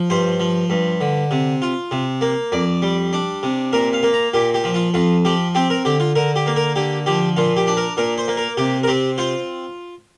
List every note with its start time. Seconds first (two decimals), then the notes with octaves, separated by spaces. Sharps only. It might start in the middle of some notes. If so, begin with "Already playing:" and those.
Already playing: F3
0.10 G2 C5
0.40 F3
0.70 G2
1.01 D3
1.31 C3
1.62 F4
1.91 C3
2.21 A#3
2.52 F2 D5
2.82 G3
3.13 D4
3.43 C3
3.73 A#2 A#4
3.93 F5
4.03 A#3
4.13 A#5
4.33 A#2 G4
4.54 G4
4.64 F3
4.74 F4
4.94 F2 F4
5.25 F3 G4
5.55 C4 G4
5.70 A#4
5.85 D3 G4
6.00 F4
6.15 D3 A#4
6.36 G4
6.46 A#3
6.56 A#4
6.76 D3 G4
7.06 F3 G4
7.37 A#2 F4
7.56 G4
7.67 D4
7.77 A#4
7.97 A#2 A#4
8.18 C5
8.28 A#3
8.37 A#4
8.57 C3 G4
8.83 A#4
8.88 C4 G4
9.18 F4 C5